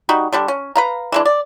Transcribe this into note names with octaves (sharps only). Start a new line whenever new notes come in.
G3 D#4 F#4
D3 G3 D4
C#4
B4 F5 A#5
E3 G#3 D4
D5